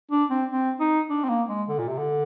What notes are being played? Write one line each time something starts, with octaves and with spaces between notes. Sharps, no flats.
D4
C4
C4
D#4
D4
C4
A#3
G#3
D3
A#2
C3
D3